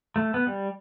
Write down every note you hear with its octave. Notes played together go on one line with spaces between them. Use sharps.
A3
B3
G3